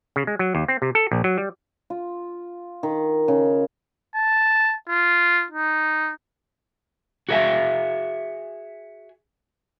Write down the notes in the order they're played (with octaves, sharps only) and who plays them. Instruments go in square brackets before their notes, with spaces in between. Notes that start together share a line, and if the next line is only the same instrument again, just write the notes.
[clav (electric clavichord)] C#3
G#3
F#3
D#2
C4
C3
A4
A#1
F#3
G3
[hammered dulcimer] F4
D#3
C#3
[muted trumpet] A5
F4
D#4
[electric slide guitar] F#4 G#4 A#4 D#5 E5 G#5